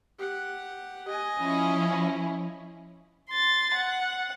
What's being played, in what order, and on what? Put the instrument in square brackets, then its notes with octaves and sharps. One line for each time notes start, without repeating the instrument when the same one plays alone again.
[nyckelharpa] G4 F#5
D#5 G#5
[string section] F3 C#4 E4
[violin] C6 A6
F#5